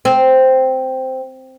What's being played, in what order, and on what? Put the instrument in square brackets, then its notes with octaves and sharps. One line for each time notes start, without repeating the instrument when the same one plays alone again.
[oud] C4